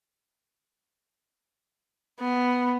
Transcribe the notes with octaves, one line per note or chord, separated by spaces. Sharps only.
B3